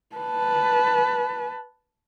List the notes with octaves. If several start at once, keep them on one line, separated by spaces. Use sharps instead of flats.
B4 A5